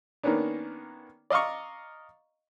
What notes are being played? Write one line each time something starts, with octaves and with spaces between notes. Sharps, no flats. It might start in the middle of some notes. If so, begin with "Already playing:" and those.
D#3 A#3 B3 C#4 D4
D5 D#5 F5 A#5 C#6